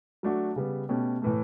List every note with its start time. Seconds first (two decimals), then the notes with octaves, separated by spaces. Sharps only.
0.23 F#3 A3 D4 F#4
0.56 C#3 G3 B3
0.89 B2 A3 C#4 G4
1.22 A2 E3 A3